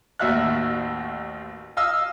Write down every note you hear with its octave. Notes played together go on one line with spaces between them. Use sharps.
A1 D#2 F#4 E5 F5 F#6
D#5 F5 E6